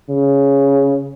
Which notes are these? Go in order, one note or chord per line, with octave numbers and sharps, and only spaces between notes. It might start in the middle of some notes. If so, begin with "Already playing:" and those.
C#3